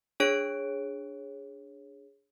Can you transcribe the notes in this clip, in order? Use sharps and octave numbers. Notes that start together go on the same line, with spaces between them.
D4 G#4 C#5 D7